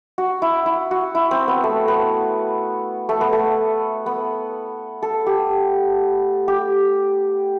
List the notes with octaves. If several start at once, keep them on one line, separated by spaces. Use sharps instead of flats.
F#4
E4
E4
F#4
E4
C4
B3
A3
B3
A3
B3
A3
B3
A4
G4
G4